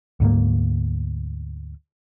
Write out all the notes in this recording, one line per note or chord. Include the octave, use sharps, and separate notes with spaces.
D2 G#2 F#3 A#3